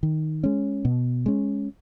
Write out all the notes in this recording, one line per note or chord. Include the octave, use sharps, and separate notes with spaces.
D#3
G#3 C#4
B2
G#3 C#4